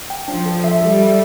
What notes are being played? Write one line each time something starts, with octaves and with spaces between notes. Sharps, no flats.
G5
F3 D4
A4
E5
G3 A4
E5